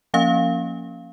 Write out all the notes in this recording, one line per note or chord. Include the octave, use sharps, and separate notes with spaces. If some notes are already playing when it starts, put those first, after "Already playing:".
F3 A#3 C#4 F5